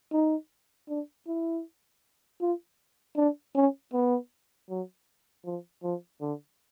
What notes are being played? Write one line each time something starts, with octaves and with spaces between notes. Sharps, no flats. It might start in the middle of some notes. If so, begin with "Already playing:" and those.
D#4
D4
E4
F4
D4
C#4
B3
F#3
F3
F3
D3